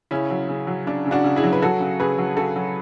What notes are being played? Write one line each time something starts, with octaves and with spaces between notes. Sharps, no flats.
C#3 C#4 E4
F#3
C#3
F#3
C#3 D4
C#3
D4 F#4
C#3
E4 G#4
F#3
B4
F#3 F#4 A4
C#3
C#3 G#4 B4
F#3
C#3 F#4 A4
F#3